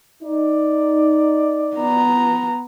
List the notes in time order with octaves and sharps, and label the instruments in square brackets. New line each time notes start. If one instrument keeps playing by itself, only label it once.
[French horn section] D#4 [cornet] D5
[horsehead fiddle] B3 A#5